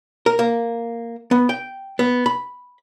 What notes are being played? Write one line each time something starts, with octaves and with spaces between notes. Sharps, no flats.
A#4
A#3
B3
G5
B3
B5